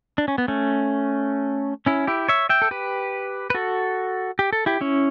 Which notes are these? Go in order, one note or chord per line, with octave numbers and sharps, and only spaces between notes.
D4
C#4
B3
A3 C#4
C#4 E4
E4 G4
C#5 E5
E5 G5
A4
G4 B4
B4
F#4 A4
G4
A4
E4 G4
C#4 E4